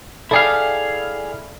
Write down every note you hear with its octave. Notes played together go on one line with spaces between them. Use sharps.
E4 G#4 A4 D5 F5 G5